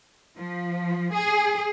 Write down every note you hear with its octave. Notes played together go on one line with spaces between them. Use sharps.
F3
G#4